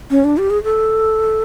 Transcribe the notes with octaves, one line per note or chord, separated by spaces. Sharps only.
C#4
D4
G4
G#4
A4